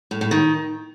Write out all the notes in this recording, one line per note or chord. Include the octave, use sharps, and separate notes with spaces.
A2
A2
D#3